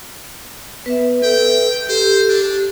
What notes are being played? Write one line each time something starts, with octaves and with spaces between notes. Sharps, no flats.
B3 B4 E5
A4 G5
G4 A4 C5
D4